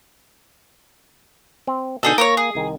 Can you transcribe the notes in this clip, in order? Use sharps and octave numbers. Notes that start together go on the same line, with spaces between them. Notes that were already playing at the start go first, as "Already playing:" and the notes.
C4
B2 D3 D#4 G#4 A4
A#3 A#4 C5 C#5
G#4
C2 D#3